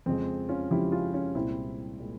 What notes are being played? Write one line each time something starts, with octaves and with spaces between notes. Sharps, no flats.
F2 C#3 F3 G#3 C4
C#4 F4
F2 C#3 F3 G#3 E4 G4
C#4 F4
C#4 F4
C2 A#2 G#3 C4 E4
A#2 G#3